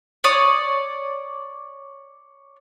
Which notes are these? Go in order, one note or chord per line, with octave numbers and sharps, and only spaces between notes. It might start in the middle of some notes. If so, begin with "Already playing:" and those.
C#5 D5 D#6